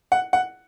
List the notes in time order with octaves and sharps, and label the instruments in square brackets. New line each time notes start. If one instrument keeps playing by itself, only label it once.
[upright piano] F#5
F#5